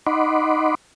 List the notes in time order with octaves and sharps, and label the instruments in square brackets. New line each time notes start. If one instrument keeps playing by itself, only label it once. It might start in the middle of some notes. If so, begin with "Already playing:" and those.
[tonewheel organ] D#4 D#5 F#5 B5 C6 D6